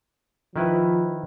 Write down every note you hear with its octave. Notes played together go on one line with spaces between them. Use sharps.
D#3 F3 E4 B4